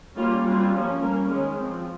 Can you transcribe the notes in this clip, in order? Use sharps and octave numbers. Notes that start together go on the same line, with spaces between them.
G3 A#3 C#4 F4
G3 C4 F4
F3 A#3 C#4
G3 A#3 C#4 A#4
D#3 G#3 C#4
F3 C4